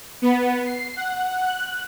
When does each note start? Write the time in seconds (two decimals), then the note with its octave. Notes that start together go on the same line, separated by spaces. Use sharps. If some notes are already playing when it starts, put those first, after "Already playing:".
0.22 B3
0.65 C7
0.96 F#5
1.45 F#6